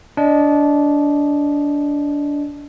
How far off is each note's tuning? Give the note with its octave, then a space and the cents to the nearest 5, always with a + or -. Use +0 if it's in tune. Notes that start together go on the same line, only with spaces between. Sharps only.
D4 -20 D#5 -10